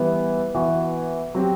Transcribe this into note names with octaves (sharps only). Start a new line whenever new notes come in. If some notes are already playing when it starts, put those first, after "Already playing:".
Already playing: E3 G3 B3 E4
E3 B3 F#4
F#3 C4 G4